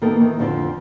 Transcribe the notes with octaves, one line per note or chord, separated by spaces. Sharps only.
D#3 A#3 B3 A4 A#4
D#3 E3
F2 D3 F3 C4